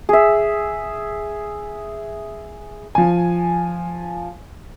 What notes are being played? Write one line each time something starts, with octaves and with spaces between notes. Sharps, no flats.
G#4 E5
F3 G#5